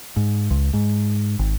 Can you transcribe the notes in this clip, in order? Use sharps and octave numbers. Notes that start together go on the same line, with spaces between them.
G#2
C#2
G#2
G#1